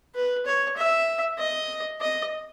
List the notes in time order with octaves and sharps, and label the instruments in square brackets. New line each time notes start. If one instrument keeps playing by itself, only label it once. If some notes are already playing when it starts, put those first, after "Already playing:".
[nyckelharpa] B4
C#5
E5
D#5
D#5